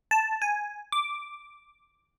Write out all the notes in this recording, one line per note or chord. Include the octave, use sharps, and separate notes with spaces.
A5
G#5
D6